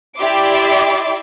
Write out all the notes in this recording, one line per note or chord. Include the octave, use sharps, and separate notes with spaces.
E4 G4 D5 E5 C6 D6